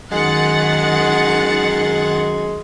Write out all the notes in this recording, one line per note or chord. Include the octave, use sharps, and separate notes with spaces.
F#2 D#3 G#3 F#5 A6